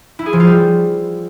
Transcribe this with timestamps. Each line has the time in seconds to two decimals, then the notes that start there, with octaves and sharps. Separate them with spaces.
0.19 E4
0.26 G#4
0.33 F3
0.40 F4
0.47 G3